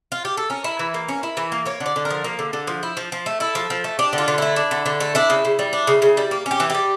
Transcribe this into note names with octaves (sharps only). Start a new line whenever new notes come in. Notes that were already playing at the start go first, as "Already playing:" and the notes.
F4
G4
A4
C#4 A#4
E4
E3
A#3
C#4
E4
E3
A#3
A#3 C#5
D3
D5
D3
A#4
F3
A#3
D3
D3
F3
E4
F3
F3
A3
E4 A4
F3
F3
A3
D4 G4
D3
F4
D3
A3 E4
D4
D3
D3
A3
D4 E4
C#3
C#3
G3
D4
C#3
C#3
G3
A#3
C#4
G4
E3
G3 G4